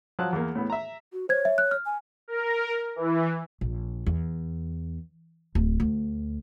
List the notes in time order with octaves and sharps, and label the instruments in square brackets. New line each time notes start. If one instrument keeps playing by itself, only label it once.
[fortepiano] F3 F#3 A5 F#6
E2 A#3
A2 B3
E5 A#5
[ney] F#4
[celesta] C5 G#6 [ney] C#5
[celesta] E5
F#6
F6
[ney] G#5
[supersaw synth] A#4
E3
[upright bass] A#1
E2
D1
D2